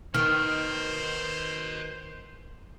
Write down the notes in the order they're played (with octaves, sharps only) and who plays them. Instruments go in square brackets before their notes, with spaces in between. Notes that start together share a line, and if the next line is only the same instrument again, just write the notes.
[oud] D#3 [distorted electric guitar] B4 D#5 [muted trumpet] C5 [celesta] F6